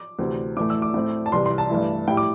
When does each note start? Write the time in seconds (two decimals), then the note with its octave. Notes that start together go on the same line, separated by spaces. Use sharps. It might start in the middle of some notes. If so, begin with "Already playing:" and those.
Already playing: D6
0.19 D2 C3 E3 C4
0.57 A2 E3 A3 D6
0.70 E6
0.82 D6
0.94 A2 A3 C4
1.26 A5
1.32 C2 C3 E3 C6
1.46 C6
1.58 A5
1.70 G2 E3 A3 E4
2.08 A2 G3 E4 G5
2.17 D6